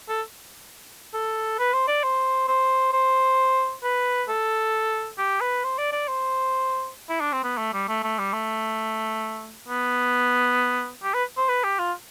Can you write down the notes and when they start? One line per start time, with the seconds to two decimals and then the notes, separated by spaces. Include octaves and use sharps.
0.09 A4
1.14 A4
1.59 B4
1.73 C5
1.88 D5
2.04 C5
2.48 C5
2.93 C5
3.83 B4
4.29 A4
5.18 G4
5.41 B4
5.64 C5
5.78 D5
5.93 D5
6.08 C5
7.09 E4
7.21 D4
7.33 C4
7.44 B3
7.58 A3
7.73 G3
7.89 A3
8.03 A3
8.18 G3
8.33 A3
9.68 B3
11.03 G4
11.14 B4
11.37 C5
11.49 B4
11.64 G4
11.79 F4